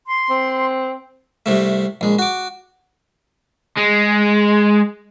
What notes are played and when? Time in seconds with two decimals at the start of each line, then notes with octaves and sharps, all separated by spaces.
0.07 C6
0.30 C4
1.46 C2 C3 A3
2.01 A#1 G#3
2.19 F#4 D6
3.78 G#3